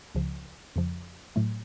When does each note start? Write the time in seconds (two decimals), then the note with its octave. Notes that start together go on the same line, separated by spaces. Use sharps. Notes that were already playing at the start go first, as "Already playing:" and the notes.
0.15 C#2 C#3 F3
0.76 F2 C#3 F3
1.36 A2 F#3 A3